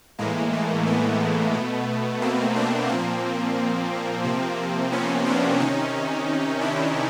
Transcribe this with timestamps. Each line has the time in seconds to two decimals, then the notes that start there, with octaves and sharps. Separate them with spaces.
0.19 A2 E3 G#3 A#3
0.53 A3
0.86 A3 B3
1.54 B2
2.22 A#3 C4
2.56 C4 D4
2.89 A#2 F3 A#3 C4
4.24 C3 F3
4.92 B3 C#4
5.26 C4 D4
5.60 C3 D#3 C#4 D#4
6.61 D4 E4